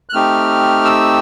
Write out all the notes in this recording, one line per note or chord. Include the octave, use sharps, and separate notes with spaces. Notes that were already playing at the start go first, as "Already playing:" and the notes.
F#6
A3 C4 D#4 G4 F6
E6